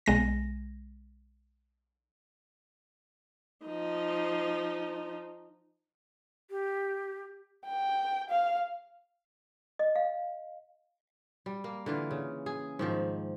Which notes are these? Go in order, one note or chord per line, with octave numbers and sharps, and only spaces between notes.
B1 G#3 A#6
F3 D#4
G4
G5
F5
D#5
F5
G3
A#3
D3 E3 F4
C#3
G#4
G#2 D#3 F3